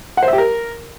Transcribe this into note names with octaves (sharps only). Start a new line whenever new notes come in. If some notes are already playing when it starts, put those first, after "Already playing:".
F#5
C5
E5
G4
A#4